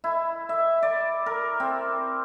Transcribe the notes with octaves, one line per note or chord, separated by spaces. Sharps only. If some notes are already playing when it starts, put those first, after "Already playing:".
E4
E5
D5
A#4
C4